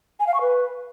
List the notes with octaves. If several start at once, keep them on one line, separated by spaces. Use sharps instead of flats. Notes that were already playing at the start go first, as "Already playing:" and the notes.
G#5
F5
C#6
B4